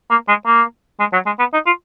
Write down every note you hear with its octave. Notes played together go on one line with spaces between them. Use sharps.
A#3
G#3
A#3
G#3
F#3
G#3
B3
D#4
F4